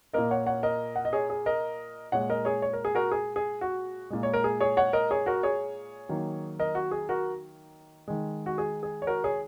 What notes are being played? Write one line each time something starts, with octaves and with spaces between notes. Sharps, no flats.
A#2 A#3 A#4 D#5
C#5 F#5
C#5 F#5
A#4 D#5
F#5
D#5
G#4 C#5
G#4
A#4 D#5
A#2 G#3 C#5 F#5
A#4 D#5
G#4 C#5
C#5
A#4
G#4
F#4 A#4
G#4
G#4
F#4
A#2 G#3
C#5
A#4
G#4
G#4 C#5
C#5 F#5
A#4 D#5
G#4 C#5
F#4 A#4
G#4 C#5
D#3 F#3 A#3
A#4 D#5
F#4
G#4
F#4 A#4
D#3 G#3
F#4
G#4
G#4
C#5
F#4 A#4
G#4 C#5